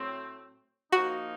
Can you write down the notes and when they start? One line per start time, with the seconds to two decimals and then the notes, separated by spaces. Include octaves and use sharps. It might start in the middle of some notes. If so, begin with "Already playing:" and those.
Already playing: A2 F#3 A3 C4
0.92 F3 A#3 D#4 F#4